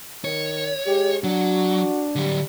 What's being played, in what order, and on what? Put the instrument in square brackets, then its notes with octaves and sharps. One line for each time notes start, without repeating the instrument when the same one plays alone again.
[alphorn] D#3 [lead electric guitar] C#5
[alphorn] G#3 [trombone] G4
[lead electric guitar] F#3 [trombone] D4 [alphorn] F#4
[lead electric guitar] D3 F#3 [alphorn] G3